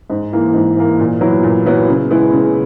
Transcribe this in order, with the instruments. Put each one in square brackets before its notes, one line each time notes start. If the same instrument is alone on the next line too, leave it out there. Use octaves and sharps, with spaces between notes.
[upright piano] G#2
E3 A#3
G#2
E3 A#3
A#2
F#3 B3 E4
A#2
F#3 B3 E4
C#3
G#3 B3 E4
C#3